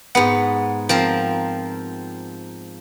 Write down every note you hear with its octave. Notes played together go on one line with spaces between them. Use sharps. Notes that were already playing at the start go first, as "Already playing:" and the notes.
G#2 B3 F#5
F3 C4 A#4